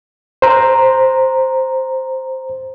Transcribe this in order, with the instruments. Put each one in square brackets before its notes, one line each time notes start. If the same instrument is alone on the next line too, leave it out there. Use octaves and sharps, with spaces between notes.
[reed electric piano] C5 A#5